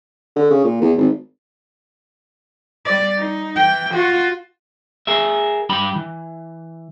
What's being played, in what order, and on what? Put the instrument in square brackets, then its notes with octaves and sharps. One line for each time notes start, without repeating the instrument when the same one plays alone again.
[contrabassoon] D3
C#3
A#2
E2
G#1
[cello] G3 D5
D#4
E3 G5
F4 F#4
[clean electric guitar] G#4 A#4 E5
G2 G4 B5
E3